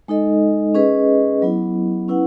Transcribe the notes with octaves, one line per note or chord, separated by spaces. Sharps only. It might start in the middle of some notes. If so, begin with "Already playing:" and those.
G#3 D#4 A4 D#5
C#4 G#4 B4 D#5
F#3 B3 E4
C#4 E4 B4 F#5